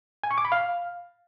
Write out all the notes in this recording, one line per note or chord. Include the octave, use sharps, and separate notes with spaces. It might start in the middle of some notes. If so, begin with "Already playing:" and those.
G#5
C#6
D6
B5
F5